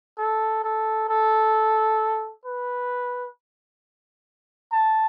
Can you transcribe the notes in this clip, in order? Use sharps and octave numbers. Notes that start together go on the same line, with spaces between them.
A4
A4
A4
B4
A5